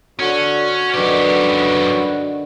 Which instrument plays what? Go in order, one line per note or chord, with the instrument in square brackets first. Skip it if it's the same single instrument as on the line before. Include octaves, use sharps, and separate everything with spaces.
[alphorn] D3 [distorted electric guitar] C#4 [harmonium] F#4
[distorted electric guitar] F#2 G4 [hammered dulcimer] D3 D#3 [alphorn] B4